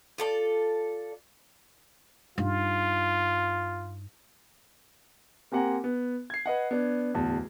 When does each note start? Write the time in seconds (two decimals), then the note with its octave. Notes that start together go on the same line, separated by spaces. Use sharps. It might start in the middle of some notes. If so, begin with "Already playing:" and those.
0.18 F4 A4 D5
2.38 G2 D#4 F4
5.52 A#3 C4 G4 F#5 G#5 A#5
5.84 B3
6.30 G#6 C7
6.46 B4 D#5 F#5
6.71 B3 D4
7.14 D1 E2 A5